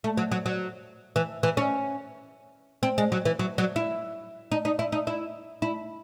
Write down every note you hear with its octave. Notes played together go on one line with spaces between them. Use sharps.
A3
F#3
F#3
F#3
E3
E3
C#4
C4
G#3
F#3
E3
F#3
F#3
E4
D#4
D#4
E4
D#4
E4
E4